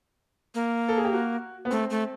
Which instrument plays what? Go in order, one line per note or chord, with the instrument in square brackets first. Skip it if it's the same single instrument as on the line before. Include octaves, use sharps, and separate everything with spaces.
[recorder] A#3
[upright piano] A4
G#4
G4
F#4
B3
[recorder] A3 [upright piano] C4
[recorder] A3